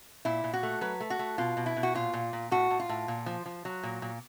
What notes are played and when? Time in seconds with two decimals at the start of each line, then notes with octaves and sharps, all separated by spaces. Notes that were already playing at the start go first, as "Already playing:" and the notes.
0.25 A#2 E4
0.44 A#2
0.53 F#4
0.63 A3
0.81 F#3 B4
1.00 A3
1.10 F#4
1.19 A3
1.38 B2 F4
1.57 B2
1.66 E4
1.77 B2
1.83 F#4
1.95 A#2 F4
2.13 A#2
2.33 A#2
2.51 A2 F#4
2.70 A2
2.80 F4
2.89 A2
3.08 A#2
3.26 F3
3.46 F3
3.65 F#3
3.83 A#2
4.02 A#2